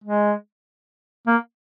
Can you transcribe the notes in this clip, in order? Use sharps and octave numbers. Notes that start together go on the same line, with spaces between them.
G#3
A#3